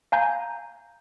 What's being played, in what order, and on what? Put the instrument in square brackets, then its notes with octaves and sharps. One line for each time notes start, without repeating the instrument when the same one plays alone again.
[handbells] F5 G#5 A#5 G6